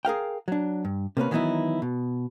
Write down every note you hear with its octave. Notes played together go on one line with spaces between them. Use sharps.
G#4 A#4 F5 G5
F#3 D4
G2
C3 A#3 C#4 B4
D#3 E3 F#3 B3 D#4 E4
B2